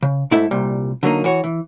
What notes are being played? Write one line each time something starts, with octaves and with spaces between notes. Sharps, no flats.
C#3
G#2 A3 E4 A4 E5
C2 A#2 G3
D3 F#3 A#3 D#4
E3 F#4 C#5
E3